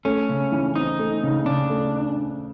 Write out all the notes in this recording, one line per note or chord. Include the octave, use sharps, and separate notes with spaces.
A3 C#4
C#3
E3
C4 D#4
A3
C#3
C#3 D4
A3